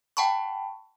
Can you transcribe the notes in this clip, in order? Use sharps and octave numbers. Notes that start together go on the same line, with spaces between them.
F#5 G5 A5 B5 C#6